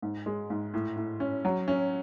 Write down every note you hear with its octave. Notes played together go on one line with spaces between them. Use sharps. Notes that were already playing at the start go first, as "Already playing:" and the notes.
G#2
G#3
G#2
A2
A2
C#4
F#3
C#4